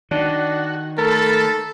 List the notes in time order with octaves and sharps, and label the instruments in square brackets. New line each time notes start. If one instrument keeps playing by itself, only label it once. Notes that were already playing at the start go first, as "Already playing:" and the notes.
[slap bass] D#3 [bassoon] D4 [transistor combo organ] F#4
[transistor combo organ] A3 A5 B5 [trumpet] A4 [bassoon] A#4